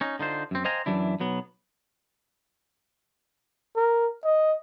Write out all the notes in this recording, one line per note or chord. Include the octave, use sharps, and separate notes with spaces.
C#4 D#4
D3 D#4 F4 C5
F#2 C4
C5 D#5 F5 G5 G#5 A#5
F#2 B2 E3 F#3 D4 E4
B1 F#3 B3
A#4
D#5